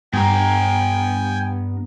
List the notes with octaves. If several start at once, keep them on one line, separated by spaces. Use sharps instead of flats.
G2 B3 G5 G#5 A#5